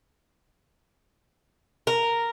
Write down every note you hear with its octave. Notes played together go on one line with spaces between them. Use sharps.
A#4